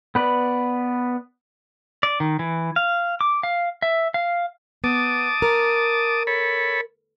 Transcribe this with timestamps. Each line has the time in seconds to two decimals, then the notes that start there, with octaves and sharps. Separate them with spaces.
0.15 B3 B4 D5
2.03 D5
2.20 D#3
2.39 E3
2.76 F5
3.21 D6
3.43 F5
3.82 E5
4.14 F5
4.84 B3 A5 D6 D#6
5.42 A#4
6.27 A4 C#5 B5